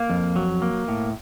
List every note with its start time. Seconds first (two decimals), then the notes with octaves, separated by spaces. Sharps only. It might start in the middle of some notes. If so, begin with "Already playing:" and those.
Already playing: A#3 F5
0.10 F2
0.36 F#3
0.62 A#3
0.88 A2